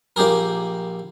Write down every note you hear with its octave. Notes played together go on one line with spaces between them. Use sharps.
A#1 A#3 G4 G#4 A#4